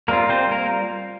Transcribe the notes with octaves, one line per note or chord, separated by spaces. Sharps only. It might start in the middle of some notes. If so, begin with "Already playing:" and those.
G3 A#3 C4 F4 A#4
C4 C5
A#3 A#4